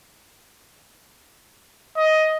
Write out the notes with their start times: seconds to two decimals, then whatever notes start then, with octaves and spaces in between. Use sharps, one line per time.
1.97 D#5